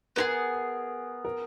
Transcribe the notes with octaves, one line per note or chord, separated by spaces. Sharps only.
B3 E4 G#4 A#4
A#4